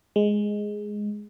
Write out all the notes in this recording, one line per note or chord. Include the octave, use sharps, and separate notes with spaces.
G#3